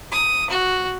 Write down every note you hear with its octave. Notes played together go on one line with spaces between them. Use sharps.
D#6
F#4